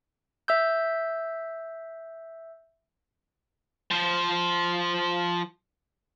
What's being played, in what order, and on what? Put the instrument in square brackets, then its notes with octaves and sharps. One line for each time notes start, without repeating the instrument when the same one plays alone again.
[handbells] E5 E6 G6
[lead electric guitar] F3 C5